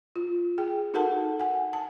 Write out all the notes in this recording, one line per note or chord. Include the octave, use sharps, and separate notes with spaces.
F4
G#4 G5
D#4 F#4 A4 A#4 F#5 A5
F#5 G#5
A5